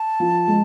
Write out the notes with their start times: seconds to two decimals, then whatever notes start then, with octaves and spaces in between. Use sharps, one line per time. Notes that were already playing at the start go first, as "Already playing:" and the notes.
Already playing: A5
0.20 F3
0.48 G#3